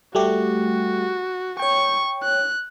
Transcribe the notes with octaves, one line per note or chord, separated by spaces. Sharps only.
G3 A3 F#4 G4
C#5 G5 C#6
F#6